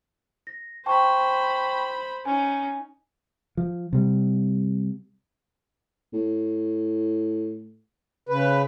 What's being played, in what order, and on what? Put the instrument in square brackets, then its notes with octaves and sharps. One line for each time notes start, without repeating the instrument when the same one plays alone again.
[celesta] A#6
[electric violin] C5 B5 [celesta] G5 A5 C#6
[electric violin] C#4 D#4 [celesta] G#5
[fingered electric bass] F3
C3 G3
[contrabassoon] A2
[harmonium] C#3 B4